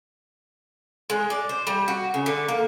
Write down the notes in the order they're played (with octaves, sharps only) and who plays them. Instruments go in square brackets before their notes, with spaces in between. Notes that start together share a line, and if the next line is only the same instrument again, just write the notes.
[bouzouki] G#3
D5
C5
G3
F#4
C#3
D3
A#3